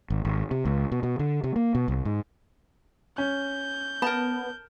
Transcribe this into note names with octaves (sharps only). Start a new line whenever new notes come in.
G#1
G#1
C3
C#2
B2
B2
D3
C3
A#3
B2
C2
G#2
C#4 G6
B3 A#4 A5